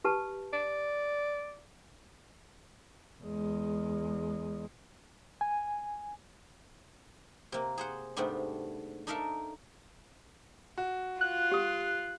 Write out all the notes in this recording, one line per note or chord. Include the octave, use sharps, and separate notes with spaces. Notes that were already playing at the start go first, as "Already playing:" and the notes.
G4 B4 A5
D5
E2 G#3
G#5
C3 A#3
G#4 C5 F#5
G#2 C3 G3 A3 B3 D4
D4 D#4 A4 A#4 E5 F5
F#4
F4 F#6
G4 D#6